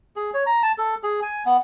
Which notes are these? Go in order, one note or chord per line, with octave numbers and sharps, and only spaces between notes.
G#4
C#5
A#5
A5
A4
G#4
G#5
B3